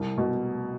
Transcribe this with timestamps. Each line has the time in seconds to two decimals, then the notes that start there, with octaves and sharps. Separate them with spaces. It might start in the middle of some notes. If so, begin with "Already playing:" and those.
Already playing: C2
0.17 B2